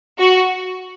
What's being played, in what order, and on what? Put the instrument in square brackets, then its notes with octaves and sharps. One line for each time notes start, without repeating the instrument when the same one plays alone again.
[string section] F#4